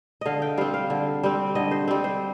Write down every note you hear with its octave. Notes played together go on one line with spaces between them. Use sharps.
D3 D#5 F5
G5
G3 C4 F5
F5
D3
G3 C4
D3 D#5
C5
G3 C4
C5